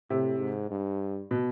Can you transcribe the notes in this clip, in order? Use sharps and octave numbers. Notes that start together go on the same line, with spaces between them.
A2 C3
G#2
G2
B2